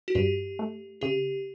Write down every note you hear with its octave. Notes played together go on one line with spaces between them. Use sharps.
F#4
G2 G4
A3
C#3 G4